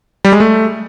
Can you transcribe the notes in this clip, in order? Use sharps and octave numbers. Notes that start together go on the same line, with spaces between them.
G3
G#3
A3